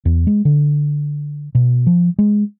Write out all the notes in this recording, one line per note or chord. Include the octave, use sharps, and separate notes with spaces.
E2
G#3
D3
B2
F3
G#3